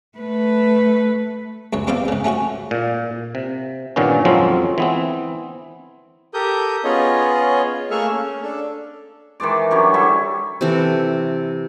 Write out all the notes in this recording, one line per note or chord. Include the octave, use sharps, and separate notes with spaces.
A3 B4
C#2 F#2 C#5
E2 G3 C4 G4 D5 F5
G#2 C#3
A3 C#4 F#4 C#6
A#2
C3
G2 A#2 D#3 B3 C#4
F2 F3 F#3 G#3 C4 C#4
E3 B3 C4
G4 A4 A#4 D#6 G6
B3 C#4 F4 G#4 C#5 D#5
A3 A#3 G#4 E5 C#6 F6
C#4
D4 A4
D#3 E3 G#3 D5
D3 F#3 G3 C#4
D3 G3 E4
C3 E3 A4